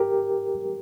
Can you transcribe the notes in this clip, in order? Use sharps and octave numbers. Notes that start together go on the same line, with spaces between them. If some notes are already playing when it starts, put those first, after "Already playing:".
Already playing: G4 A#4